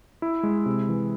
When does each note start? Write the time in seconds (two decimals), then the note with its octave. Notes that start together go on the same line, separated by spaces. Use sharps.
0.22 E4
0.43 G#3
0.66 C3
0.89 E3